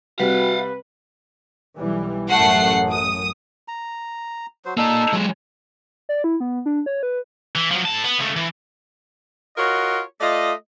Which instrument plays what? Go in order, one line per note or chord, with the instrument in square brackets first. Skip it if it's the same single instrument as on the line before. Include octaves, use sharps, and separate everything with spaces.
[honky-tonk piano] C3 G3 [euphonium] F#4 [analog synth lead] B4 [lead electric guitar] F5 F#5
[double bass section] B1 E3 G3
[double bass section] A1 F#2 [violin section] A3 F#5 C7
[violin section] D#6
[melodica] A#5
F#3 C5
[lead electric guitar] A#3 D5 [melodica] D#4 A4
[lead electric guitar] F#3 G#3
[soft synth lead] D5
E4
B3
D4
C#5
B4
[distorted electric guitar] E3
F3 F#3
A2 A5
B3
C#2 A3
E3
[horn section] F4 F#4 A#4 C#5 D#5 F#5
A3 F4 D5 D#5